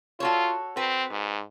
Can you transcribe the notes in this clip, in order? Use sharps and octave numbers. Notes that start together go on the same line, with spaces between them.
F4 F#4 A4 C#5
C4 F#4 B4
G#2